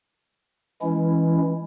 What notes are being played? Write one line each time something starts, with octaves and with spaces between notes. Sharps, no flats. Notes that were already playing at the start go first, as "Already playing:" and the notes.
E3 G#3 C#4 E4